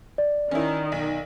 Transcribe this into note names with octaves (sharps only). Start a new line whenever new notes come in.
D5
D#3 C#4 E4
B1